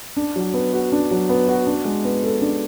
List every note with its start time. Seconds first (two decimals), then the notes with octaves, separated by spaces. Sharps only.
0.17 D4
0.36 F#3
0.54 B3
0.73 F#4
0.92 D4
1.11 F#3
1.29 B3
1.48 F#4
1.67 D4
1.85 G#3
2.04 B3
2.23 A4
2.41 D4